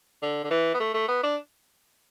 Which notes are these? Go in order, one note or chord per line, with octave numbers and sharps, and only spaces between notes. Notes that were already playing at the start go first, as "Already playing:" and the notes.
D3
D3
E3
B3
A3
A3
B3
D4